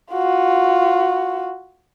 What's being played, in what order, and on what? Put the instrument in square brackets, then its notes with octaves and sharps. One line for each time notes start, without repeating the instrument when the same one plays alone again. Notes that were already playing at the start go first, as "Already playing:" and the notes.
[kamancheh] F4 F#4